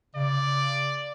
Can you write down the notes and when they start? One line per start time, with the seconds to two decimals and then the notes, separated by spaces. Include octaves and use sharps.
0.15 C#3 D5